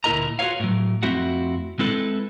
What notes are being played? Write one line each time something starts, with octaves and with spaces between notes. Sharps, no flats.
D2 A#2 E4 A#4 D#5 A#5
F4 F#4 A4 B4 C#5 F5
A2 F#3
F2 A3 C4 E4 F#4 F#5
G#3 C4 E4 A4 B4